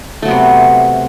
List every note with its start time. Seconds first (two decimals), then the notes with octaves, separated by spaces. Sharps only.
0.22 A3
0.25 F#3
0.28 B3
0.31 C3